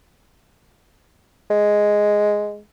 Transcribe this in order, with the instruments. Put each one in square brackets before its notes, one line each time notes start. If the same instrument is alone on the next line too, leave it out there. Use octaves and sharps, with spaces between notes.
[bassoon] G#3